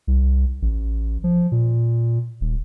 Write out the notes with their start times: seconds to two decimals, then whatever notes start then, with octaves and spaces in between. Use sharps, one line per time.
0.07 C2
0.62 A1
1.24 F3
1.52 A#2
2.41 D#1